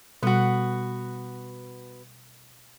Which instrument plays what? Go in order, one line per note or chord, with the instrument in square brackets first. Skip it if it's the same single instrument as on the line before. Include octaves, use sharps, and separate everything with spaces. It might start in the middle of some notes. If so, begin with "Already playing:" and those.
[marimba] B2 G3 [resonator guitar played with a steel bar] B3 F#4